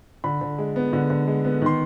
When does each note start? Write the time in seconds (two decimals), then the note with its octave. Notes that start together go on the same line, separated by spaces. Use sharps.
0.24 D3 B5
0.41 D3
0.58 G#3
0.76 B3
0.93 D3
1.10 D3
1.27 G#3
1.45 B3
1.62 D#3 C6